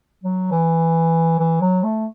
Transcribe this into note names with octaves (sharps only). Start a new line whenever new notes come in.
F#3
E3
E3
F#3
A3